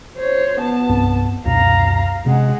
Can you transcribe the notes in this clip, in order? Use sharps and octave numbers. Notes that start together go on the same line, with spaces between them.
C5 C#5
B3 A5
C2 G2 C4
C#2 F#2 B2 F5 A#5
C3 G#3 C4 C#4 F#5